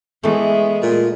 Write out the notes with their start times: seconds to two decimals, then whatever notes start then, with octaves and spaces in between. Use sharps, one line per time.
0.23 E3 G#3 A3 B3
0.82 A#2